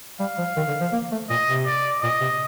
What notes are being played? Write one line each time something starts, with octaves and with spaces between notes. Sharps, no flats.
G3 F5
F3
D#3
D3
F3
A#3
A3
A#2 D#5
C3
D5
A#2 D#5
C3